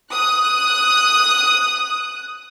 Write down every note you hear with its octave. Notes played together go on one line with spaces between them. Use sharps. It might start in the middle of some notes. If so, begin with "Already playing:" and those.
D#6 F#6